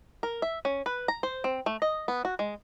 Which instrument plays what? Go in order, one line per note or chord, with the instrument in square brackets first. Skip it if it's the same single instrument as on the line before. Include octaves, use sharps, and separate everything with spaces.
[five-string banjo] A#4
E5
C#4
B4
A#5
C5
C4
A3
D#5
B3
F#4
G#3